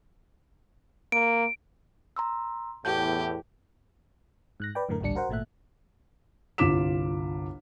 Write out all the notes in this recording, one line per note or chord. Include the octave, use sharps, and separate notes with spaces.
A#3 D7
A#5 C6 E6
E2 A2 G4 A5 G6
G#2 F#6 A#6
B4 D5 G5
F#2 A2 D3 A3 A#4
A1 D2 A#2 G3 D4 C#7
F#4 A#4 C5 F#5
G#1 A#2 A3 E5 F#6
G1 C2 F4 D6 B6 E7